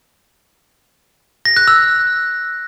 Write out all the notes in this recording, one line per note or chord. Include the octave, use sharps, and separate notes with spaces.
A#6
F#6
E6